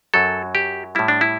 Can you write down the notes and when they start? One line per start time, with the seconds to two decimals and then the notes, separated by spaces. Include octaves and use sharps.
0.14 F#2 F#3 A4
0.55 G4
0.95 A2 G3 E4
1.08 D4
1.21 E4